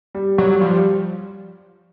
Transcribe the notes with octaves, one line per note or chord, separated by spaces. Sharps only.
G3
F#3 G3
F3 G3
G3